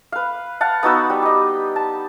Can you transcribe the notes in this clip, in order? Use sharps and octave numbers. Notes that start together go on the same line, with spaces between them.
B4 F5
F5 F#5 A5
B3 D#4 F#4 E6
G3
G4 D#5
A5